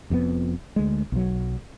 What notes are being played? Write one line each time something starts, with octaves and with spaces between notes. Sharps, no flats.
F1 F2 A2 B3
D2 G#3
B1 F#3